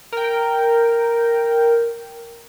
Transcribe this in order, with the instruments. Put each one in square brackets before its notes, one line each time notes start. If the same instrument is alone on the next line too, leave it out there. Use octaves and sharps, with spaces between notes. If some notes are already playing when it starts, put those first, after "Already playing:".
[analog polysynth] A#4 G5